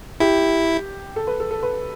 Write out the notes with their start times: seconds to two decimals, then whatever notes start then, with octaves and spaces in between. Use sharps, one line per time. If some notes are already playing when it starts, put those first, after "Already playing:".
0.20 E4 G4
1.16 A4
1.27 B4
1.40 A4
1.51 A4
1.63 B4